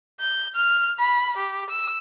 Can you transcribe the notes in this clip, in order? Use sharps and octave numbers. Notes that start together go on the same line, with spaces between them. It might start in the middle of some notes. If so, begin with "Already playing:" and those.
G6
F6
B5
G4
E6